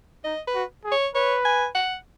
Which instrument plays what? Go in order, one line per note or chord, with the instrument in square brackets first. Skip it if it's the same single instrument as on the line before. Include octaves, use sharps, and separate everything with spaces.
[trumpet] D#4 [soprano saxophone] D#5
[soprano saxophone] B4
[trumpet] F#4
G#4
[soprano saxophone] C#5
[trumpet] B4 [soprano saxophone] C#5
[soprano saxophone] G#5
F#5